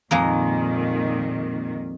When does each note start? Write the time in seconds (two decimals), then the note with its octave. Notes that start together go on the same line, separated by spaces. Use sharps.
0.11 F2 A#2 D#3 G#3 A#3